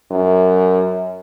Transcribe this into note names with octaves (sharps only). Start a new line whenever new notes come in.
F#2